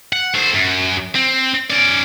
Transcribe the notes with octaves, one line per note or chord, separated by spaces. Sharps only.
F#5
A3 C5
F#2
C4
C#4 D5